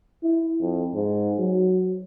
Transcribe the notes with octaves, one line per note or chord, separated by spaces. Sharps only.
E4
F2
G#2
F#3